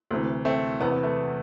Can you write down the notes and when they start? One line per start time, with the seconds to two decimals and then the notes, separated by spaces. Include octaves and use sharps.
0.11 D2 C3 E3
0.45 A3 C4
0.80 E2 C3 E3 B3
0.92 B3
1.03 A3